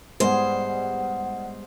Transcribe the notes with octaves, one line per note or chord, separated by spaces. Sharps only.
G#2 G3 B3 G#4 C5 F#5